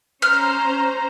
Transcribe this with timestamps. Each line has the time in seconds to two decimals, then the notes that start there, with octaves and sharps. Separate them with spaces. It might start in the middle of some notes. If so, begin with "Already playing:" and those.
0.22 C#4 C5 A#5 F6